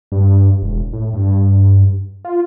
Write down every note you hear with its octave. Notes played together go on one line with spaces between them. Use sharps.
G2
E1
A2
G2
F4